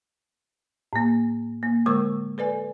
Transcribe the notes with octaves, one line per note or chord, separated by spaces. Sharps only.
A2 A#3
A#3
D3 G#3 A#4 C#6 E6
A4 B4 D5 G#5